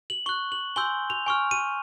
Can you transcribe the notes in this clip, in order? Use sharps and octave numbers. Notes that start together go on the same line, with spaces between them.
F#7
C#6 F#6 G7
F#7
G#5 C6 E6 G6 G7
F7
G#5 C#6 F6
D#7